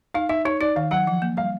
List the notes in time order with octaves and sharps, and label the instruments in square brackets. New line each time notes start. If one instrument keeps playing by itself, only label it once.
[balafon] D#4 [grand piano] F5
[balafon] D#4 [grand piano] E5
[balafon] D#4 [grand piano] C#5
[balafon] D#4 [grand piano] D5
[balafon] D#3 [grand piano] F5
[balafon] F#3 [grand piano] F#5
[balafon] F3
A#3
[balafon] G3 [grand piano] F5